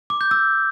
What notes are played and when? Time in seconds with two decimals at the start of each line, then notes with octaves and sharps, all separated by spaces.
0.10 D6
0.21 G6
0.31 E6